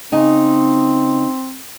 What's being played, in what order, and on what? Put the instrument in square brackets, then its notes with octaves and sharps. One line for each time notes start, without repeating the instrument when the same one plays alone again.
[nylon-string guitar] C#3 D#4 G#5 [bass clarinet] C4